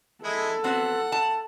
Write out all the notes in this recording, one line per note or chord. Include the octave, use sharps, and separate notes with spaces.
G#3 E4 A4
B3 C4 F#4 F#5
A5